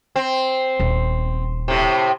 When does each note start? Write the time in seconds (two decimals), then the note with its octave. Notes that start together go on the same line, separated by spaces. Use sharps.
0.16 C4
0.80 D#1
1.68 A2 C3